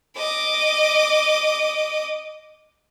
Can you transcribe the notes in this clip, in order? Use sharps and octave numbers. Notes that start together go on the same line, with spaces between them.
D#5 D6